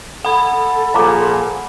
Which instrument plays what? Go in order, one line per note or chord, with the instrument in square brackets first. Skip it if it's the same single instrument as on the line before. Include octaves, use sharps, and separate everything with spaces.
[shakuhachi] A4 [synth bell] F#5 B5
[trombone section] A#2 F3 G#4 [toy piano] F5 A#5 D6